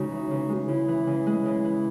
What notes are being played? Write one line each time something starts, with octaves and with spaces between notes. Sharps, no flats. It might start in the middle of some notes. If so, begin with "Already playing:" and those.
Already playing: C#3 G#3 D#4 F#4
E3
C#3
G#3
C#3 E4
E3
C#3
G#3
C#3
E3